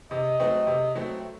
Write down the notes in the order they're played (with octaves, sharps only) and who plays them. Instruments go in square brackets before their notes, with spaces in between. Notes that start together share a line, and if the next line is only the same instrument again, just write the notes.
[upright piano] C3 [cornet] D#5
[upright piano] F#3 A3 C4
C3
F#3 A3 C4